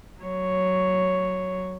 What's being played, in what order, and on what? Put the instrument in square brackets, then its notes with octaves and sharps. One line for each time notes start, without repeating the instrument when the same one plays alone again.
[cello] F#3 C#5